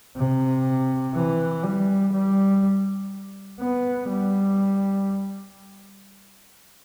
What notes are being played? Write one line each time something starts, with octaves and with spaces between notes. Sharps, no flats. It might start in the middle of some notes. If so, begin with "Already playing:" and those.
C3
E3
G3
G3
B3
G3